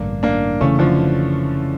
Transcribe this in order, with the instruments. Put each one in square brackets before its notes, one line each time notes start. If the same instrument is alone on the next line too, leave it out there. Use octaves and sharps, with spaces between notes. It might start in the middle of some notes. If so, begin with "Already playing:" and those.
Already playing: [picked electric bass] A1 G2 D3 [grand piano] A#3 D4
[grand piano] A#3 D4
[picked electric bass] F1 E2 C#3 E3 [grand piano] A3 C#4
[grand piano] D3 F3